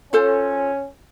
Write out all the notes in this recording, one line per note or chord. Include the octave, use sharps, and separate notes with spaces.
C#4 F4 A4 C5